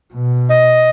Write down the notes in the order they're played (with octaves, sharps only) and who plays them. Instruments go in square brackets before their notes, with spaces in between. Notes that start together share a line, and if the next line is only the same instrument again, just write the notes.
[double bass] B2
[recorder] D#5